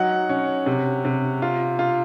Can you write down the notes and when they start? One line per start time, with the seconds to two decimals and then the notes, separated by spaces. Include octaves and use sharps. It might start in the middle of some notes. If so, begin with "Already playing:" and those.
Already playing: F#3 D#4 F#5
0.29 C#4
0.66 C3
1.05 C3
1.42 F4
1.79 F4